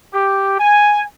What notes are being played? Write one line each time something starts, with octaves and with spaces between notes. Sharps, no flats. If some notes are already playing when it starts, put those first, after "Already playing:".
G4
G#5